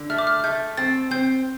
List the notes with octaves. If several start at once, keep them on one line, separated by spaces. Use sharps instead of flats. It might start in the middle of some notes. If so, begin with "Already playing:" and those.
Already playing: D3
A3 F6
D6
F6
A3 G6
C4 A6
C4 G6